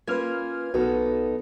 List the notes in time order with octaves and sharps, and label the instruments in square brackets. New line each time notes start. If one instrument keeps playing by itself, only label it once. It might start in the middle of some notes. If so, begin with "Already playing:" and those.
[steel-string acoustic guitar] A#3 C#4 F4 [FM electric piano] B4 F6 G#6
[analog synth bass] B1 [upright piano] B3 [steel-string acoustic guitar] D#4 A4 [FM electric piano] F#4